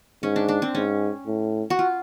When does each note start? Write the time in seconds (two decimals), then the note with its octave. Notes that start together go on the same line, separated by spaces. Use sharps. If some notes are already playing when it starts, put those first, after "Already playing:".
0.23 G#2 C#4
0.36 D4
0.48 D4
0.62 C4
0.75 G#2 C#4
1.27 A2
1.70 F#4
1.79 F4